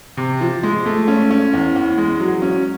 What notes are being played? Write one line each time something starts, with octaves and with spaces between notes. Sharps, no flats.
C3
F3
G#3
A3
C#4
C#4
E2
E2
G#3
F#3
C#4